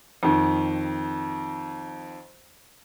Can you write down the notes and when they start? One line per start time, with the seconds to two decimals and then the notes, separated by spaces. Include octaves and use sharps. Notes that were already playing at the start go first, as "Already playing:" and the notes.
0.23 F2 D#3